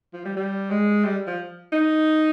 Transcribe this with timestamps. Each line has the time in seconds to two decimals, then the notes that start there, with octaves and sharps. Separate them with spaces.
0.14 F3
0.26 G3
0.36 G3
0.71 G#3
1.05 G3
1.27 F3
1.73 D#4